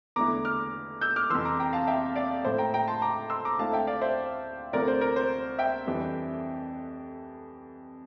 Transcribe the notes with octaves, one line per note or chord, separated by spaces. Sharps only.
E2 D3 A3 E4 A#5 D6
D6 F6
E6 G6
D6 F6
F2 C3 E3 C6 E6
A#5 D6
G5 A#5
F5 A5
E5 G5
D5 F5
A2 F3 A3 C5 E5
G5 A#5
G5 A#5
A5 C6
A#5 D6
C6 E6
A#5 D6
D2 D3 A3 C4 E4 F5 A5
E5 G5
D5 F5
C5 E5
D2 C3 F3 A3 C4 A#4 D5
C5
A#4
C5
E5 G5
F2 E3 G3 D4